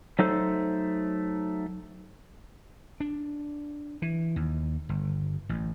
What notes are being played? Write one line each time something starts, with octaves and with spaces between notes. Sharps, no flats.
F#3 A3 D#4 A4 C5
D4
E3
D#2
G1
A1